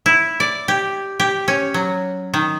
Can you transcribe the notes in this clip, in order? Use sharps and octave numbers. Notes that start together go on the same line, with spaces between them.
E4
D5
G4
G4
C#4
F#3
D#3